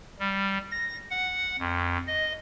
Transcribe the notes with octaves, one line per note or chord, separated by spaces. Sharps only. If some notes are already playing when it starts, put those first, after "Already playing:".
G3
A#6
F#5
F2
D#5